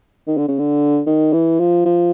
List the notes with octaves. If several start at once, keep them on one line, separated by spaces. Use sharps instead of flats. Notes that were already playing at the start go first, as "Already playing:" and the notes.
D#3
D3
C#3
D3
D#3
E3
F3
F3